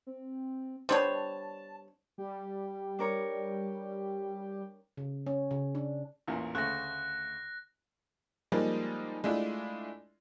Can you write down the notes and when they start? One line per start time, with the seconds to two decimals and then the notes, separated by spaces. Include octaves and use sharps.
0.07 C4
0.89 G3 B3 D4 C5 C#5 A5
2.18 G3 G4
2.99 D4 A#4 C#5
4.97 C#3
5.27 C#4
5.51 C#3
5.75 D4
6.27 A1 E2 A#2
6.55 D2 C#3 A3 F#6 A#6
8.52 F3 G3 G#3 A#3 D#4
9.24 G#3 A3 D4 E4 F4